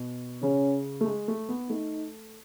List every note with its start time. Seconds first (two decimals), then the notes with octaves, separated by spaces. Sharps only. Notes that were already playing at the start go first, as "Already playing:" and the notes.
Already playing: B2
0.42 C#3 C#4
1.01 A3
1.06 G#3
1.28 A3
1.49 B3
1.70 A3 D#4